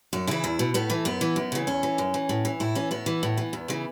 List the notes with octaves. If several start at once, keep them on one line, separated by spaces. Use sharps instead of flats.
F#2 F#4
C#3 E3 E4
E2
B2
A2 B3
E3 A3
F#2 B3
E3
F#2
C#3 E3
E2 C#4
E3
F#2
E3
A2
E3
A2 E4
E3 C#4
A2 B3
E3
A2
E3
E2
C#3 E3